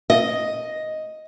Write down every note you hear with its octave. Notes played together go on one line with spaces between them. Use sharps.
D#5